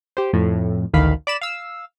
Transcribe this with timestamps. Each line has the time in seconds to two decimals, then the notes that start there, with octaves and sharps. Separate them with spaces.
0.17 G4 C5
0.33 F2 A2
0.93 A1 D2 D#3 F5 B5
1.27 D5 B5 E7
1.41 F5 E6